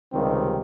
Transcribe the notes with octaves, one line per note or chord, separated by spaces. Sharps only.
C#2 C3 D#3 G3 C4